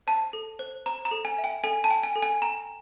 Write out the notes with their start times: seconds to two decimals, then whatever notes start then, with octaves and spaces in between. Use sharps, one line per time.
0.07 C5 A5
0.33 A4
0.59 C5
0.86 C5 A#5
1.05 A#5
1.11 A4
1.25 G#5
1.38 E5
1.44 G5
1.64 A4 G#5
1.84 A5
1.90 G5
2.03 G#5
2.16 A4
2.22 G#5
2.42 G5 A#5